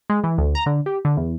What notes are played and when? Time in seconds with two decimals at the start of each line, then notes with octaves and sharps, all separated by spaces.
0.10 G#3
0.24 E3
0.38 D2
0.55 A#5
0.66 D3
0.86 G4
1.05 D3
1.17 E2